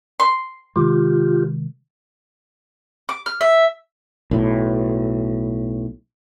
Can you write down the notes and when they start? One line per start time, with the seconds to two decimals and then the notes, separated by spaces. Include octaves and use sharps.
0.20 C6
0.76 C3 D#3 G#3 F4 G4
3.09 D6
3.26 F6
3.41 E5
4.31 B1 A2